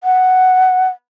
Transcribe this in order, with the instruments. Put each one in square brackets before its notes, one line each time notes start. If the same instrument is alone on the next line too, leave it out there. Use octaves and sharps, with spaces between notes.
[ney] F#5